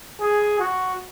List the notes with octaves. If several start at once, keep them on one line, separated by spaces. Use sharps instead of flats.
G#4
F#4